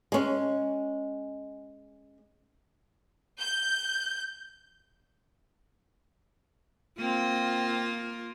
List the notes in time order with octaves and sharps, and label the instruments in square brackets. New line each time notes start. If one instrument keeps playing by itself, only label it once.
[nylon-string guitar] G#3 C#4
[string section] G6
[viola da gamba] A#3 F4 [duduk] C4